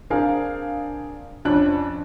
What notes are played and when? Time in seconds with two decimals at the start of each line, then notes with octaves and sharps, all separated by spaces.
0.10 C4 D4 G#4 A#4 F5
1.45 F2 C#4 D4 F#6